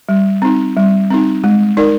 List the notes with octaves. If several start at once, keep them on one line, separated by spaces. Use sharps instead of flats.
G3
C4 D#4
G3
C4 D#4
G#3
D#4 A#4 D5